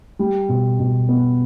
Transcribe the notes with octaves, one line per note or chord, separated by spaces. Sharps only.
G3
B2
B2
B3